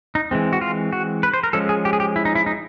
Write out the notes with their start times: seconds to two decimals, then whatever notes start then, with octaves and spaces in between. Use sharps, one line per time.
0.15 D#4
0.31 E3 G#3 C4
0.53 F#4
0.61 F4
0.93 F#4
1.23 B4
1.34 C5
1.43 A#4
1.53 F3 G#3 C#4 A4
1.69 G#4
1.85 G4
1.93 G#4
2.00 G4
2.16 E4
2.25 D#4
2.35 E4
2.46 D#4